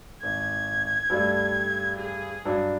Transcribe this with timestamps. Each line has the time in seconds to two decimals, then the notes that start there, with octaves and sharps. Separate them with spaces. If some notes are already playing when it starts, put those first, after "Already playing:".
0.23 G#1 G#6
1.10 G2 G3 A3
1.97 G#4
2.45 G2 F#3 D4